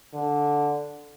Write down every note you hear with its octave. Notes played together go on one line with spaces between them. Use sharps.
D3